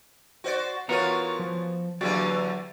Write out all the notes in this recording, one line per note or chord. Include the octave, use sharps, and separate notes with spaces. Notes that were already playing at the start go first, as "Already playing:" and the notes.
F#4 C5 D5
E3 B3 F4 F#4 A#4 C#5 F#5 A#5
F3
E2 D3 F#3 A#3 F#4 G4 D5